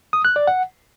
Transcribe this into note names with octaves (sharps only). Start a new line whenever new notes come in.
D#6
F#6
D5
F#5